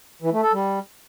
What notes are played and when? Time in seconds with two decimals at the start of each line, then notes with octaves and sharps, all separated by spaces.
0.22 E3
0.32 A3
0.43 A4
0.53 G3